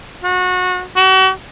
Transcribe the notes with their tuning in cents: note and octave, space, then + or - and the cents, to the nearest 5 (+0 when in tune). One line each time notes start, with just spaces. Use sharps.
F#4 -25
F#4 +40